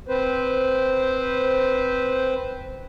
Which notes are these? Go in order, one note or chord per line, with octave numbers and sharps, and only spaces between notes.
C4 B4 C5